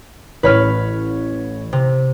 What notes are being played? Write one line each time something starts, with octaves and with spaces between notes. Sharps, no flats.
A1 B4 C#5 B5 F6
C3